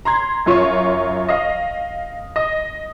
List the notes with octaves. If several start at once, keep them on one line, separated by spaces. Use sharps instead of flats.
A#5 C6 G#6
F#2 F4 C#5
D#5 F5
D#5